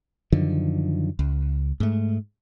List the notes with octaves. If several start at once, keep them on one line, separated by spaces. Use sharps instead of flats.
F#2 D3 D#3 F3
C#2
G#2 A3